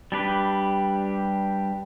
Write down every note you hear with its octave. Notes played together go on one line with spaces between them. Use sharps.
G3 D4 G4 B4